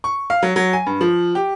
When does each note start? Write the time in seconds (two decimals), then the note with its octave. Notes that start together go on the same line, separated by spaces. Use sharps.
0.04 C#6
0.30 F5
0.43 F#3
0.56 F#3
0.73 G#5
0.86 G2
1.01 F3
1.35 G4